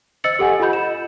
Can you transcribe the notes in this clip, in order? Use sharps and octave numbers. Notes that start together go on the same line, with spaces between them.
C5 D#5 E6 A6 C#7 F#7
G4 A4 F#5 G#5
F4 G4 D#5 B5 G6
E7